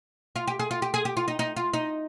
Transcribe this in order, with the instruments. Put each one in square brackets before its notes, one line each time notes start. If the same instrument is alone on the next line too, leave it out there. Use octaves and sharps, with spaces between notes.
[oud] F4
G4
G#4
F4
G4
G#4
G4
F4
D#4
D#4
F4
D#4